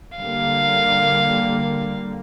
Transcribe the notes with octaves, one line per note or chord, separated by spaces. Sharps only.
D3 G3 A#3 F5